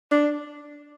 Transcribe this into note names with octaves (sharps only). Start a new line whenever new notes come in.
D4